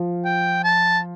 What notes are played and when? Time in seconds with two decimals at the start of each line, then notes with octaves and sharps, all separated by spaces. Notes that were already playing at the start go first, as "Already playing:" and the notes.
Already playing: F3
0.24 G5
0.64 A5